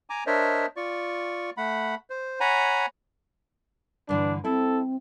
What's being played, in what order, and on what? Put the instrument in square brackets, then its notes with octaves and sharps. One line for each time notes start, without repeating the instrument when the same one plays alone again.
[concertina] G#5 A#5 D6
D4 A#4 C5 C#5 D#5 E5
F4 D5 C#6
A3 F#5 B5
C5
C#5 F#5 G#5 A#5 B5
[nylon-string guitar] G2 D3 E3 [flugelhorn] D4
[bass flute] C4 [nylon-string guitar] E4 [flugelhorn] A4